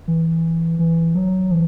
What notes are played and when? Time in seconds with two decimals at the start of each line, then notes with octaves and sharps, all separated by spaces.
0.08 E3
0.79 E3
1.15 F#3
1.51 E3